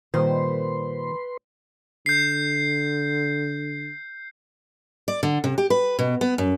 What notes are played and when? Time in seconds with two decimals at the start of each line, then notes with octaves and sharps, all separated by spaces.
0.14 A#2 D#3 G3 B4 C5 C6
2.06 D3 G6 C7
5.08 D5
5.23 D3
5.44 C3
5.58 G4
5.70 B4
5.99 B2
6.21 B3
6.38 F#2